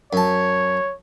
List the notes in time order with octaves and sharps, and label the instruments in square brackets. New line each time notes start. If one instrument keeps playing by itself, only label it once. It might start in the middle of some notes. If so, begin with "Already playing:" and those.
[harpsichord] F#2 A5 [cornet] C#5